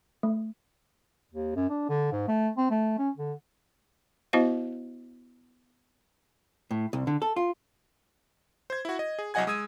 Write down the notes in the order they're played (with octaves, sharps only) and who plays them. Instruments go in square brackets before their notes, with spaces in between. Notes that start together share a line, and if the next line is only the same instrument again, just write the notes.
[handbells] A3
[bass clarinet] D#2
F#2
D4
D3
G#2
A3
C4
A3
C#4
D3
[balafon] B3 E4 F#4 C5 D#5 F5
[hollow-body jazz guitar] A2
C2
D3
A4
F4
[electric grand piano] C5 G#6
E4 F#4
D#5
G#4
C2 F#3 D#5 F#5 G#5 G#6
G#3 D#6 E6 G#6 D#7